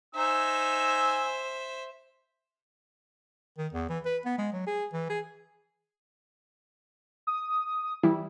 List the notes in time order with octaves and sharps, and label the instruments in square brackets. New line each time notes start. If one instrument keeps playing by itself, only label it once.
[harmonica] D#4 G#5 E6 [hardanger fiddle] C5 E5
[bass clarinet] D#3
E2
E3
B4
B3
G#3
F#3
G#4
E3
G#4
[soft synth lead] D#6
[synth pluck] E3 G3 E4